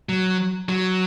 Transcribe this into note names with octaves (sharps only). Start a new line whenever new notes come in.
F#3
F#3